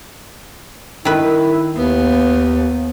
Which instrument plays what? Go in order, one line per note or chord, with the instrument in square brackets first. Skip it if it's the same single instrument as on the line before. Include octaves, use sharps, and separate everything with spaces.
[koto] D#3 B4 [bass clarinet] E4
[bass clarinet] D#2 [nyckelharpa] B3